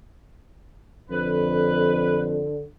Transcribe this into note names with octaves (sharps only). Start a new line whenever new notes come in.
F2 D3 B4